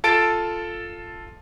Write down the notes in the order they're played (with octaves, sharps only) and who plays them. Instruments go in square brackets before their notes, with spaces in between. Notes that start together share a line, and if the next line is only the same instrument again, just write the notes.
[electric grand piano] F4 A4 A5 A6 D7